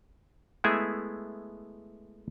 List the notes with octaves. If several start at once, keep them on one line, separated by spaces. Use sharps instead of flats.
G#3 A3 B3 E4 G#4 E5